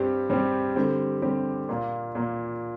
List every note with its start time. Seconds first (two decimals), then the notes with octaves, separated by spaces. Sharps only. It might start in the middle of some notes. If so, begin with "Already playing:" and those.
Already playing: G2 G3 C4 G4
0.30 G2 G3 C4 G4
0.76 D3 G3 C4 G4
1.22 D3 G3 C4 G4
1.69 A#2 A#3 F4
2.15 A#2 A#3 F4